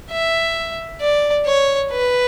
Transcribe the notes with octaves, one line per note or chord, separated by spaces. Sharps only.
E5
D5
C#5
B4